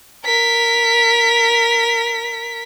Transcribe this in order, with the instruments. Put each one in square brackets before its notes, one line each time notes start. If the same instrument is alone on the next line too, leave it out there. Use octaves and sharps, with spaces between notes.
[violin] A#4 B6